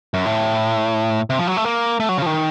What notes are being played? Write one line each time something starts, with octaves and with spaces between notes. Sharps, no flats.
F#2
A2
C3
F3
F#3
A3
A#3
A3
F#3
C#3
F3
D#3